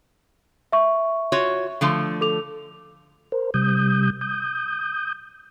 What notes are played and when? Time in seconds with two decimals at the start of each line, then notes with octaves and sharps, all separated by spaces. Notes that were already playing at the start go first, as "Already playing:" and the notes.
0.72 E5 C#6
1.32 F4 F#4 C#5
1.81 D3 F3 A3
2.21 A4 D6 F7
3.32 A#4 C5
3.54 C3 G3 D#6 G6
4.21 D#6 G6